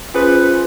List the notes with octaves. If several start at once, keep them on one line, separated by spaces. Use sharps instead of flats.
C#4 F4 G#4 B4 C5